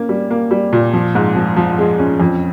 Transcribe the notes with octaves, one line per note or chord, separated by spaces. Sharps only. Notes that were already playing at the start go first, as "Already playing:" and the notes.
Already playing: A#3 C#4
G3
A#3
G3
A#2
F3
G#2
F3
F3
G#3
C#4
F2